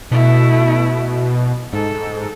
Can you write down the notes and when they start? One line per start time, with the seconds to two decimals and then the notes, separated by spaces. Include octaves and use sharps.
0.11 B2 A3 E4
1.73 G#2 A4